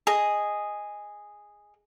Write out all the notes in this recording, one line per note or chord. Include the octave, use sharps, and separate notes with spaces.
G#4 D#5